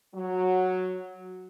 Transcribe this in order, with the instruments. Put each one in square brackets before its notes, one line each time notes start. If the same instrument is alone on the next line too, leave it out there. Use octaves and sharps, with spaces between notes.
[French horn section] F#3